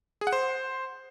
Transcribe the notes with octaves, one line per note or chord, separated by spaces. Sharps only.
G#4
F#5
C5